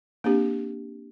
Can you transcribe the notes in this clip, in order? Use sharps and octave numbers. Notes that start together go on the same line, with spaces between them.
A#3 C4 D4 G4